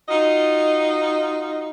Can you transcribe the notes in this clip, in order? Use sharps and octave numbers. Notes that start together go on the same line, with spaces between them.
D#4 F4 F#4 D#5